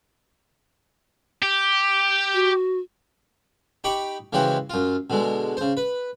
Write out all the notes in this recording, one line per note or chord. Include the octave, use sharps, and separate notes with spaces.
G4
F#4
D#4 G4 B5 C#6 D6
C#3 E3 G#3 F#4 G4 C5
F#2 F4
B2 D3 G#3
C#3 C5
B4